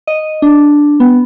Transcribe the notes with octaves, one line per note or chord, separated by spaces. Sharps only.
D#5
D4
B3